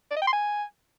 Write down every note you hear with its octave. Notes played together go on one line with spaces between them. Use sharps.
D5
D#5
G5
C6
G#5